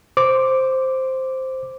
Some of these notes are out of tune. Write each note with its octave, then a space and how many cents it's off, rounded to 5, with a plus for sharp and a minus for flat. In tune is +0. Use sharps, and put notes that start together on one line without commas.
C5 +0 D6 +0